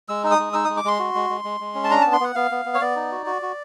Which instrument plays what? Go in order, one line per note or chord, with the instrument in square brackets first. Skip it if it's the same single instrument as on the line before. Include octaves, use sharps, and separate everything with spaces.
[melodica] G#3 E6
D#4 E6
D#6
G#3
D#4 E6
G#3 D#6
D6
G#3 C6
F#4
G#3
G#3
G#3
G#3
C#4
A5
D4 A#5
B3 A5
C6
B3 F#5
B3 F5
B3
B3
C#5
B3 D5
D#4
F#4
F#4
F#4